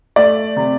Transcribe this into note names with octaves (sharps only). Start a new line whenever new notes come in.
A3 D5
C3